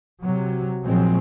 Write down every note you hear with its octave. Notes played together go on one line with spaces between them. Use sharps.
C3 F#3
A#2 F3 F#3 G#3 C4